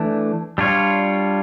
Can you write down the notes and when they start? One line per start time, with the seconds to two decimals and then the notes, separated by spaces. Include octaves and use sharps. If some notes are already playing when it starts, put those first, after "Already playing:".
Already playing: E3 A3 D4
0.58 G3 D4 F4 C#5